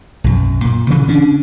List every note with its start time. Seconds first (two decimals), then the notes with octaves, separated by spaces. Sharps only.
0.24 B1 F#2
0.65 A#2
0.90 C#3 E3
1.07 D3 C#4 D4